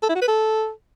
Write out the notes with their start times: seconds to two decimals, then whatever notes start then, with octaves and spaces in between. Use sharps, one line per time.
0.03 A4
0.09 E4
0.15 F#4
0.21 B4
0.28 A4